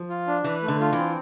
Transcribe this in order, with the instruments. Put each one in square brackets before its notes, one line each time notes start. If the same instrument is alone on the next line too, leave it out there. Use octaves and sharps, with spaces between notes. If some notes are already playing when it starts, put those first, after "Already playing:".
Already playing: [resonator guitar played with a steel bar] F3
[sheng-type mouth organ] F4
D4
[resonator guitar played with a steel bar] E3 [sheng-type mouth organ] B4
[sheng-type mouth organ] A3
[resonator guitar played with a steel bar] D3
[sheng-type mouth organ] F4
[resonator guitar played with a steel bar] E3
[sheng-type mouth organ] C4